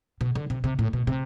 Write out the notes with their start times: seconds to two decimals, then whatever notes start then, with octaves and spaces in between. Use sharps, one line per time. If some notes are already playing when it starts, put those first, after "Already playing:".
0.21 B2
0.35 D3
0.50 C3
0.64 C3
0.79 A2
0.93 B2
1.07 C3